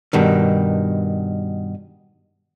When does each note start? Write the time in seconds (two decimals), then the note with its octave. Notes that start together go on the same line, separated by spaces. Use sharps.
0.13 G2 B2 D#3